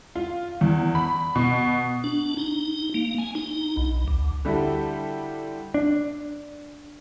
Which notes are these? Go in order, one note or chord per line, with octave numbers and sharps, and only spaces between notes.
F4
E2
B5
B2
D4
D#4
A#3
G#5
D#4
B1
D2
D3 G3 E4 F#4 G4 A4
D4